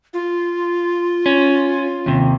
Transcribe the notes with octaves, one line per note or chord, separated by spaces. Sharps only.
F4
C#4
D#2 C3